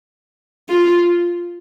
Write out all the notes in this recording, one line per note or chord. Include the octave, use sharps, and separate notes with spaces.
F4